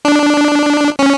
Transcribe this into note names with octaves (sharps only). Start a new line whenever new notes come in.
D4
C#4